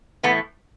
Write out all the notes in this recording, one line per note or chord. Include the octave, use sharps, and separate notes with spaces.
A2 E3 A3 B3